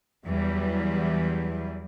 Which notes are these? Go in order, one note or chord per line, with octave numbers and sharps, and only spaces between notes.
E2 E3 F#3 G3